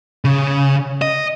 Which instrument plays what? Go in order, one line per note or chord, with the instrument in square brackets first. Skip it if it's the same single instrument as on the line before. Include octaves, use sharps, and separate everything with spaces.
[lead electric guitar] C#3
D#5